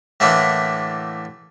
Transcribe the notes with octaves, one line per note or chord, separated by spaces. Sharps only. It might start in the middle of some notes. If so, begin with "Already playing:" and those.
A2 D3 E3 A3 A#3 D4